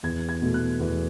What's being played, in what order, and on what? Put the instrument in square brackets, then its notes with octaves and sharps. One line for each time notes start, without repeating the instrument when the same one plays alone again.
[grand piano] E2 G#6
G#6
B2 A3
F#6
E2